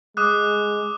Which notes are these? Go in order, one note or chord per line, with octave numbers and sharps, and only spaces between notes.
G#3 D6 D#6 F#6